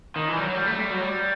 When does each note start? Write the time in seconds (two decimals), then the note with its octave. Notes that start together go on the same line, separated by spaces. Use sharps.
0.16 D#3
0.29 E3
0.35 G3
0.42 F#3
0.54 G3
0.66 A3
0.79 G3
0.91 F#3
1.01 G3